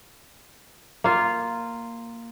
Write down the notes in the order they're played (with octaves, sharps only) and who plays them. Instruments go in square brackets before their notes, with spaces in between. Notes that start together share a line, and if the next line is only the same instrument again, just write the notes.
[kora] A#3 F4